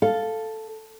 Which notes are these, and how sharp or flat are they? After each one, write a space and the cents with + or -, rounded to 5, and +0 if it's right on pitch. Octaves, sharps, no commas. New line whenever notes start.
A4 +0 F5 +0